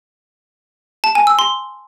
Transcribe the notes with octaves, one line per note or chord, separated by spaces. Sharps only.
A5
G#5
E6
C6